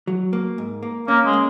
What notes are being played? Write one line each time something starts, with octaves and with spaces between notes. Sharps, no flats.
F#3
A#3
G#2
A#3
A#3 C#4
G#3
A#3